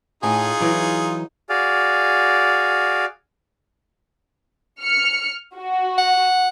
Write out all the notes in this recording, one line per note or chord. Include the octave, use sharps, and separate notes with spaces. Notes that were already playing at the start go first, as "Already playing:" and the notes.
A2 D#4 F4 G#4 G#5
E3 F#3
F#4 G#4 D5 F5
F6 C#7
F#4
F#5